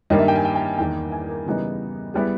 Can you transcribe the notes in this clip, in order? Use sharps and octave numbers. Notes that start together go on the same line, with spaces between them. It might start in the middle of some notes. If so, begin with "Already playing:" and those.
G2 D#3 G3 A#3 D#5
E5
G5
G#5
G5
G5
E2 D#3 A#3 G5
G#5
A#4
C#3 E3 G3 B3 D#4
G3 B3 E4 G#4